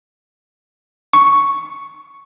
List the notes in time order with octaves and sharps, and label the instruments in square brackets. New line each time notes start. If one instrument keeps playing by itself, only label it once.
[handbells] C#6